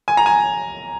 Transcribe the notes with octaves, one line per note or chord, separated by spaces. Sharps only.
G#5
A#5
G#5